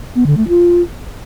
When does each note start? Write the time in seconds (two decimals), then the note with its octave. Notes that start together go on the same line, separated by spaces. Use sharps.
0.15 B3
0.26 D3
0.37 A3
0.48 F4